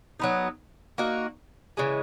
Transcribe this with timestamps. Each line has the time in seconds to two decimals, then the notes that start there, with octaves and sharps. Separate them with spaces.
0.20 F#3 B3 D#4
0.98 A#3 D#4 F#4
1.77 C#3 E3 G#3